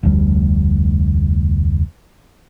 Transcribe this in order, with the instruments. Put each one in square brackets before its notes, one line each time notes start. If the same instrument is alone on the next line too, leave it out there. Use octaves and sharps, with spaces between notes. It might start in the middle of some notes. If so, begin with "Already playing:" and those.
[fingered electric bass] F1 D2 G3